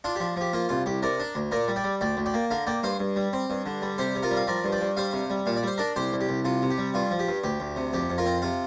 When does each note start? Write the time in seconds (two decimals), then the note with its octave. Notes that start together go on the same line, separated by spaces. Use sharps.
0.04 D4 F4
0.16 G4
0.20 F3
0.36 F3 G4
0.53 A#3 F4
0.69 C2 F4
0.86 C2 G4
1.03 C3 A#4 D5
1.20 D4
1.35 D2
1.52 A#2 A#4 D5
1.68 G3
1.76 D5 G5
1.84 G3
2.01 D2 D5 G5
2.17 D2
2.26 D5 G5
2.34 A#3
2.50 D3 F5 A#5
2.67 A#3 D5 G5
2.83 G2 C5 F5
2.99 G2
3.16 G3
3.33 C4
3.50 G2
3.66 D3
3.82 G3
3.98 C3 G4 C5
4.15 C3
4.23 F4 A#4
4.31 G3
4.37 F5
4.47 F3 A#4 D5
4.64 G2
4.72 D5 G5
4.81 G2
4.97 G3 C5 F5
5.13 C3
5.30 G3
5.46 A#2 F5
5.57 D5
5.63 G3 C5
5.78 D4 A#4 D5
5.96 C2 G4 C5
6.13 C2
6.21 G4
6.29 C2
6.45 C3 F4
6.62 C3
6.71 G4
6.78 G3
6.94 G2 F4
7.11 F3
7.19 G4
7.28 G2
7.44 D2 G4
7.60 D2
7.76 C3
7.93 F2 G4
8.09 F2
8.18 F4 A#4
8.26 C4
8.42 C3 F4